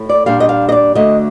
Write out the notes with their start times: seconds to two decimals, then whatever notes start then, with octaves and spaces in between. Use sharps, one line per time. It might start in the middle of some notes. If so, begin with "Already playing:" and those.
Already playing: A2
0.09 D5
0.26 A#2 G3 D4 F5
0.40 D#5
0.49 F5
0.69 D#5
0.72 D5
0.95 D2 D3 A3 D#5